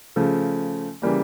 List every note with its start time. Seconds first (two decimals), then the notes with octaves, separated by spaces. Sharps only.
0.16 C#3 F3 A3
1.02 C#3 E3 G3 A#3